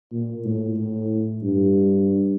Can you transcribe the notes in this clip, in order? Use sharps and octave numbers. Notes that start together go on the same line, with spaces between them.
A#2
A2
A2
G2